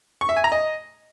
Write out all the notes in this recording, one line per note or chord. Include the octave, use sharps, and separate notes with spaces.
C#6
E5
G#5
A#5
D#5